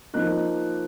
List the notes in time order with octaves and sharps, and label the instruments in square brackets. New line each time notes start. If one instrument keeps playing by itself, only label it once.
[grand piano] F3 A#3 D#4 F#6